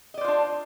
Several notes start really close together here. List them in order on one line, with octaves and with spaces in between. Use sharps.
D#5 D5 C5 F4 D4